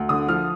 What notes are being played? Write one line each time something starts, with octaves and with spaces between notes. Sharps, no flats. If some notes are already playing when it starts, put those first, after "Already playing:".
Already playing: D2
D3 D#6
F3 F6